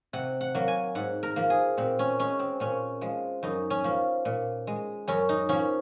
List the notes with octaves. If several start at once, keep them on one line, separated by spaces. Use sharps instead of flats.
C3 F#5
F#5
F#3 A#3
G#5
G#2 F#5
A#4
F3 A#3
G#4
A#2 C4
C#4
G#3 C#4
C4
A#2 C#4
F3 G#3
F#2 D#4
C#4
F3 A#3
A#2
G#3
F#2 C#4
D#4
F3 A#3 C#4